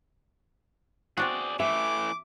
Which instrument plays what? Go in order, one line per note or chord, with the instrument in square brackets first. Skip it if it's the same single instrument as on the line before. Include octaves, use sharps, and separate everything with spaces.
[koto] C4 D4 F#4 [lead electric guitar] G#4 D5
[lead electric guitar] E3 A3 [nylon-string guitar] E5 [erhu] D6